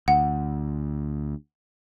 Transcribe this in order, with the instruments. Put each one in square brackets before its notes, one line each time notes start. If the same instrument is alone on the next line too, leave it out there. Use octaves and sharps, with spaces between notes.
[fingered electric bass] D2 [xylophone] F#5